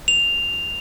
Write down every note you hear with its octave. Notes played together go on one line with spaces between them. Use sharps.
F7